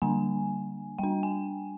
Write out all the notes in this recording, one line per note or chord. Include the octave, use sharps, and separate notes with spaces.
D3 G3 A#3 D4 G#5
G3 D4 G5
G#5